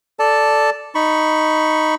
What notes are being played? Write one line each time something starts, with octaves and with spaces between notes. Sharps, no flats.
A4 D5 A5
D#4 B5 C#6